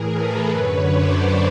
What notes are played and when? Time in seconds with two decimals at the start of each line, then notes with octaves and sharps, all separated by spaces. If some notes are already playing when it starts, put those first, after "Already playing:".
Already playing: A2 E3 G#4 A#4
0.12 A4 B4
0.49 F#2 D3 B4 C#5
0.86 C5 D5